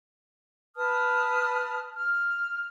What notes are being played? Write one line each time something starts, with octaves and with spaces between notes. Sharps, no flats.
B4 A5 D#6 F6
F6